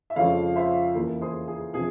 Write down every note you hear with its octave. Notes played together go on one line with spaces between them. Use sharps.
E5
F2 C#3 F3 G#3 C4 C#5 F5
C5 E5
E2 C#3 E3 A#3
G#4 C5
G#4
C3 F3 G#4